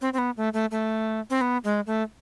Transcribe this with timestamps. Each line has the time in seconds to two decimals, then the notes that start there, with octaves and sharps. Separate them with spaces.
0.01 C4
0.13 C4
0.18 B3
0.37 A3
0.53 A3
0.71 A3
1.30 C4
1.41 B3
1.64 G#3
1.87 A3